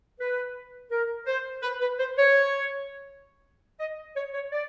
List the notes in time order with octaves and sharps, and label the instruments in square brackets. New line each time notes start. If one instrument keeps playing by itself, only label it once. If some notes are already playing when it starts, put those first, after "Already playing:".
[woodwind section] B4
A#4
C5
B4
B4
C5
C#5
D#5
C#5
C#5
D5